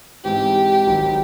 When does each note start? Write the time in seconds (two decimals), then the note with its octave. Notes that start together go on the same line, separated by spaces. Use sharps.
0.24 G#2 E3 G#3 C4 D#4 G4
0.87 G#1 G#2 D#3 F#3